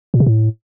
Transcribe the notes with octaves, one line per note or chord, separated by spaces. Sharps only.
A#2
C3
A2